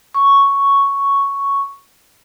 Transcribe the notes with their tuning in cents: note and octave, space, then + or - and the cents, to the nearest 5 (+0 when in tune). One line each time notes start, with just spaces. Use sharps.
C#6 +0